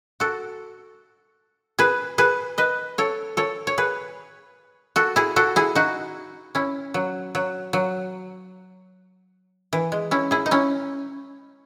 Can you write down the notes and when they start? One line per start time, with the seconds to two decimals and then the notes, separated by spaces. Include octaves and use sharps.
0.20 F#4 A4
1.79 G#4 B4
2.18 G#4 B4
2.58 B4 D#5
2.98 A4 C#5
3.37 A4 C#5
3.67 C#5
3.78 G#4 B4
4.96 F#4 A4
5.16 E4 G#4
5.36 F#4 A4
5.56 E4 G#4
5.75 D#4 F#4
6.55 C#4 E4
6.94 F#3
7.35 F#3
7.73 F#3
9.73 E3
9.92 G#3
10.11 C#4 E4
10.31 E4 G#4
10.46 D#4
10.51 C#4 E4